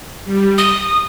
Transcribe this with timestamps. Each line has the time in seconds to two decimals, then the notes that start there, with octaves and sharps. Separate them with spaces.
0.25 G3
0.58 D#6